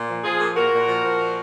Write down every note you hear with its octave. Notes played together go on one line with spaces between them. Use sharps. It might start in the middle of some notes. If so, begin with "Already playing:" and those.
Already playing: A#2
F3
F3 F4 G#4
A#2
A#2 F#4 A#4
A#2
F3
F3
A#2